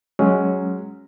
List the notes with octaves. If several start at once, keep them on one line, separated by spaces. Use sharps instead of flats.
F#3 G#3 C#4